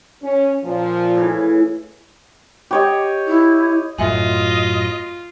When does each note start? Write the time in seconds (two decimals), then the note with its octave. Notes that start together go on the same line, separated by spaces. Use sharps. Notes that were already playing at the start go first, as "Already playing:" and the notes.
0.23 C#4
0.64 A#2 F3
1.15 A2 C#3 E3
2.71 G4 C#5 D#5
3.27 E4
3.99 F#2 A2 F#3 F4 D#5 E5 G#5